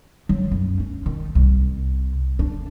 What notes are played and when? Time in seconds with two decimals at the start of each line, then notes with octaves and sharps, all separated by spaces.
0.29 F#3
0.51 F#2
0.80 C#4
1.06 D#3
1.35 C2
2.39 D4